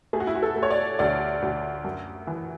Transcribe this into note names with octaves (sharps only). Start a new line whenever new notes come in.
A3 G#4
F#4
E4
F#4
A4
A3
C#5
D5
D2 D5
D2
F#2
E3